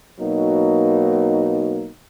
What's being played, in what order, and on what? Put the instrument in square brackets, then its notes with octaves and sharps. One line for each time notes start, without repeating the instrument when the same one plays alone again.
[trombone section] B2 F#3 A#3 D#4